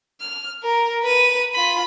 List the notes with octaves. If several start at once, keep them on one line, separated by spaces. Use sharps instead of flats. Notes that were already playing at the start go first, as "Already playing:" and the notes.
F6
A#4
B4 D#7
F4 B5